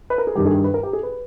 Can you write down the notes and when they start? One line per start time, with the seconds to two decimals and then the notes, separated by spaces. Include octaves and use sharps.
0.10 B4
0.18 A#4
0.27 G#4
0.35 G2 D#3 G3 G4
0.46 G#4
0.64 B4
0.74 A#4
0.83 G4
0.93 G#4
1.03 B4